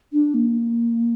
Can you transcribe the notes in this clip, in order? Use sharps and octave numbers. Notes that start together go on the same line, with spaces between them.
D4
A#3